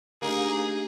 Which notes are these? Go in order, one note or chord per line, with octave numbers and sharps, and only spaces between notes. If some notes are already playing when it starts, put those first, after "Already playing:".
A3 A#3 D4 D#4 G4 G#4